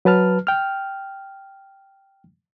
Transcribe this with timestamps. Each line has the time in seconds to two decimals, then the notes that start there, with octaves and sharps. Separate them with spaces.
0.05 F#3 B4 A5 F6
0.47 G5 F6